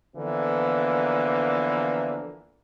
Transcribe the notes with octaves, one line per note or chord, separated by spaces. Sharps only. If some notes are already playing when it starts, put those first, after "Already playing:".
D3 E3 F3 A#3 B3